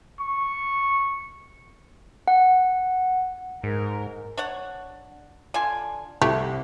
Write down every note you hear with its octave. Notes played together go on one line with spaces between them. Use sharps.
C#6
F#5
G#2 A#4
D4 C#5 F#5
D3 F4 G#5
C2 A3 E4 G4